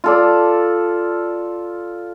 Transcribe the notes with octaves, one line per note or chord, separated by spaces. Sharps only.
F4 A4 D5